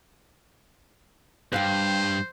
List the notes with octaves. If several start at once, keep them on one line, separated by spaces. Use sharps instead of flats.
G2 B4 C5 F5 G5